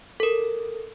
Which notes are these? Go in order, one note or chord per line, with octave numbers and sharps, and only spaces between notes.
A4 A#4